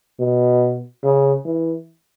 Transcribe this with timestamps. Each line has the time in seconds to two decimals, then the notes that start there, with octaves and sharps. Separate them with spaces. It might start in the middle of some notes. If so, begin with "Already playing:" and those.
0.19 B2
1.03 C#3
1.45 E3